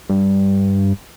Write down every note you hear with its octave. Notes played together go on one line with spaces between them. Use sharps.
G2